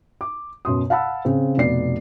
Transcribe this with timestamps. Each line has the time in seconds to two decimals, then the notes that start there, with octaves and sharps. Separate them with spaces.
0.21 D6
0.65 F#2 B2 C6 D#6
0.90 F5 F#5 A5 B5 E6
1.25 C#3 C4
1.57 F1 B2 B3 D5 C7